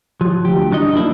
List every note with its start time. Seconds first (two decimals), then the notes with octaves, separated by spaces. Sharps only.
0.21 F3 F#3
0.45 D2 G4
0.71 F#3 D4 D#4 D#5
0.92 E2 F3 A#3 D4 E4